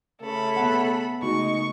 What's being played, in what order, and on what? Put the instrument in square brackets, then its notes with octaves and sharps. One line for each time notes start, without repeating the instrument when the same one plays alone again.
[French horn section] C#3 A3 [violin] A4 B5
[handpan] B3 F#5
[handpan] C#3 A3 F#4 [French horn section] G#3 D#4 [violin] C#6